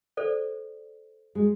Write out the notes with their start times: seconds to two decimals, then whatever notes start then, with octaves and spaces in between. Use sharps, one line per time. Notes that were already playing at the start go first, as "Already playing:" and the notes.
0.17 A4 C5 D5
1.35 G#3